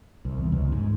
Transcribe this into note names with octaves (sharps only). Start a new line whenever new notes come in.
C2
E2
C#2
G#2